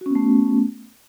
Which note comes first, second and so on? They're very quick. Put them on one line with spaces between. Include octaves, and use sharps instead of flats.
F#4 C#4 B3 A3